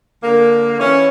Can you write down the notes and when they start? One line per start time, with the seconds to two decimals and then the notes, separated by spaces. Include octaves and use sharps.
0.21 D3 A#3
0.79 E3 C#4